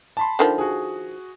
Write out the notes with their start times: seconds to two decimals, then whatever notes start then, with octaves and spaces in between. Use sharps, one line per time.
0.17 A5 B5 C6
0.39 D3 D#3 F3
0.58 F#4 G#4